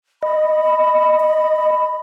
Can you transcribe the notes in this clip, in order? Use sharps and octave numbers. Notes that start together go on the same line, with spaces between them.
D#5 B5
B5